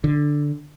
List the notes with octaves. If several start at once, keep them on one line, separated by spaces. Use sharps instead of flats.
D3